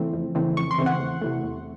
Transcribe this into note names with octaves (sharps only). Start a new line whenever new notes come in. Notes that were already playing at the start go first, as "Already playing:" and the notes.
Already playing: C#3 E3 A3 C4
F2
C#3 E3 A3 C4
F2 C#6
C6
C#3 E3 A3 C4
F#5
E2
C3 E3 A3
E2